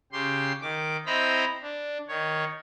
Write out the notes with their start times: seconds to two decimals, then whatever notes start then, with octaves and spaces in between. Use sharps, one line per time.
0.12 C#3 G4 C6
0.61 D#3 D6
1.06 C4 E4 C5 D#5 A#5 B5
1.62 D4
2.08 D#3 C#5